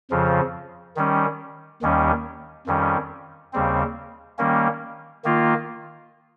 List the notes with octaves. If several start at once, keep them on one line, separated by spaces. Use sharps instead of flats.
F2 C#3 F3
D#3 G3 C#4
D#2 D#3 G3 C#4
F2 D#3 G3 C#4
D#2 C#3 G3 C4
D#3 G3 A#3 C#4
D#3 A#3 F4